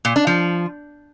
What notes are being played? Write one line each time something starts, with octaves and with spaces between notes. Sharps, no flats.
A#2
D4
F3